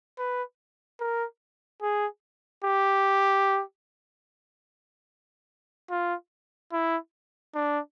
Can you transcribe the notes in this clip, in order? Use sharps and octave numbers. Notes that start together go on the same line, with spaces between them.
B4
A#4
G#4
G4
F4
E4
D4